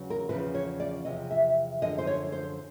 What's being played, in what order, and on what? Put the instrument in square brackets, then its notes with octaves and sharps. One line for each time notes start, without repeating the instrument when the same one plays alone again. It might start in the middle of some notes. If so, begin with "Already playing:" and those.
Already playing: [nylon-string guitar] E2 C#3 F#3
A#4
E2 C#3 F3 B4
C#5
D5
E2 C3 F3 D#5
E5
F#2 D3 F3 D#5
C5
C#5
C5